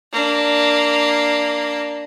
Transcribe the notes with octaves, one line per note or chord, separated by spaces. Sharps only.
A#3 D4